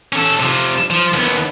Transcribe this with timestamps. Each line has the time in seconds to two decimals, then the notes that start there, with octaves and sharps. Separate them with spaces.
0.13 C#4 A4
0.40 C3 F3
0.90 F3
1.13 D#2 B3